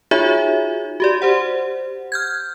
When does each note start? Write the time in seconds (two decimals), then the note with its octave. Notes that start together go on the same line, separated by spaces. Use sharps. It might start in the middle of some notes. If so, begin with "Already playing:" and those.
0.11 D#4 F4 F#4 G#4 C#5 E5
1.00 F#4 G4 D5
1.22 G4 C5 F#5
2.12 F6 G6 G#6